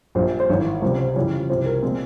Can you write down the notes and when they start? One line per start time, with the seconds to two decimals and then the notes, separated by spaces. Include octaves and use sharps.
0.15 A#1 A#2 G3 C5
0.40 C5
0.49 G#1 G#2 E3 C#5
0.82 C#2 C3 G3 C5
0.99 C5
1.15 F2 C#3 E3 G3 C#5
1.50 C2 C3 F3 C5
1.66 A#4
1.82 A#2 F3 G#3 C4